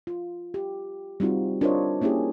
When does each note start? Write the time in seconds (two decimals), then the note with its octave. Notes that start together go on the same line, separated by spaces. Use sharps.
0.07 F4
0.54 G4
1.20 G3 C4 D#4 F4 F#4
1.61 D4 F4 A#4 C5 C#5 D#5
2.01 A#3 C#4 E4 G4 G#4